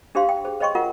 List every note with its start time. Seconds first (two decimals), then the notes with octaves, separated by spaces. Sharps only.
0.15 D4 G4 C5 F5 C6
0.29 G5
0.45 G#4 C5
0.60 C5 C#5 D#5 G5 C6 C#6
0.75 F4 A#4 F#5